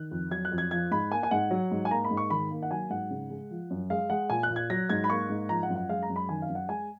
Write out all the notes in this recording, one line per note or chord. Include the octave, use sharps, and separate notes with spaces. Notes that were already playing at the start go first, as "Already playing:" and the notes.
Already playing: D#3 F#6
F2
F#3 G#6
F#6
F2
G#6
F3 G#6
G#2 B5
A#3 G#5
G#5
G#2 F#5
F#3
G#2
G#5
A#3 A#5
B5
G#2
C#6
D#3 B5
A#3
F#5
F#3 G#5
G#2 F#5
C#3
G#3
F3
F#2
G#3 F5
G#3 F#5
A#2 G#5
F#6
A#2
G#6
F#3 A#6
G#2 G#6
B5
A#3 C#6
G#2
F3 A#5
F#5
F#2
F#5
G#3 F5
A#5
F#2
B5
D#3 G#5
F5
F#2
F#5
G#3 G#5